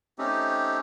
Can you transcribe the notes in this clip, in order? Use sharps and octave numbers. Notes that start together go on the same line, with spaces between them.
A3 C4 C#4 D#4 G4